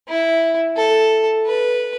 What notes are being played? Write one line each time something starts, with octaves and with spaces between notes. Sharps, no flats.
E4
A4
B4